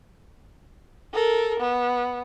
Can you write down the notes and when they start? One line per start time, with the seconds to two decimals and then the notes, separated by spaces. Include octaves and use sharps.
1.13 A4 A#4
1.60 B3